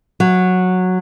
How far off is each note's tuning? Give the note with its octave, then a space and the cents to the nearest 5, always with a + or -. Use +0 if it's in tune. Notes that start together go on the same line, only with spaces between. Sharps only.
F#3 -10